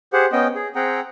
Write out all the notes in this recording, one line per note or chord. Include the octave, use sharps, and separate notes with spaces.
G4 G#4 C5 F#5
B3 C#4 D#5 G5
G#4
C4 G#4 F#5 G5 A#5